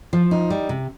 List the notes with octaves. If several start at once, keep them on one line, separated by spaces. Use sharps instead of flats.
F3
D#4
G3
C3